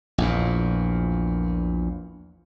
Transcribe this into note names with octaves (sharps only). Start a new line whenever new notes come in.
A#1 E2 A#2